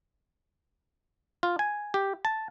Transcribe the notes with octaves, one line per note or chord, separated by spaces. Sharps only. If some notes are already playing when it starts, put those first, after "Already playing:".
F4
G#5
G4
A5